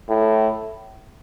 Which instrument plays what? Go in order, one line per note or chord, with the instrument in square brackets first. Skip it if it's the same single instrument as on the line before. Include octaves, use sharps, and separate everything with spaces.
[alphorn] A2